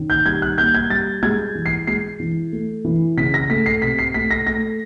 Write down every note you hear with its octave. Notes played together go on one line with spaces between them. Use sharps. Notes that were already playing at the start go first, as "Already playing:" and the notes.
Already playing: D#3 C#4
G6
G3 G#6
F#6
A#3 G6
G#6
G3 A6
G#3 G#6
E3
C7
G#3 C7
E3
A3
E3
C#3 B6
A#6
A3 B6
C7
C3 B6
C7
A3 B6
A#6
A3 A#6